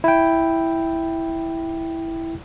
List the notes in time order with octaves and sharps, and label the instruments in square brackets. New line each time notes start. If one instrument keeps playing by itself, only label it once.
[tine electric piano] E4 G5